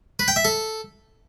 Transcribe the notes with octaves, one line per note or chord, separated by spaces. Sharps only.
B4
G5
E5
A4